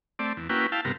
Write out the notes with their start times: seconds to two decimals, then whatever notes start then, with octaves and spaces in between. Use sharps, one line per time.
0.19 A3 C4 D5
0.37 E2
0.49 A#3 C#4 E4 F#4 B4 G5
0.72 E4 F5 G5 A5
0.85 G2 C3 B3 A#4